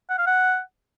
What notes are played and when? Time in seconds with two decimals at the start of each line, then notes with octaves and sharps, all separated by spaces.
0.10 F#5
0.18 F5
0.27 F#5